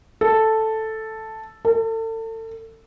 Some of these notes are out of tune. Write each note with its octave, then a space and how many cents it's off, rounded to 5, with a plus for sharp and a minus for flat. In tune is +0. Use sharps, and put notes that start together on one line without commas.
A4 +0
A4 +35